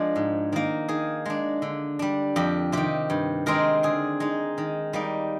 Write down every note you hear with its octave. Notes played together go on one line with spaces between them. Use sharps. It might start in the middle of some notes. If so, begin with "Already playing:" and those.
Already playing: F3 G#3 D4
G#2
D#3 A#3
D#3 G#4
G#3 D4
D3
G3 D4
F2 G4
C3 D#3 G4
G2
D#3 G#3 C4 D#4 A#4
D3 G#4
G#3 D#4
D#3
G3 A#3 D#4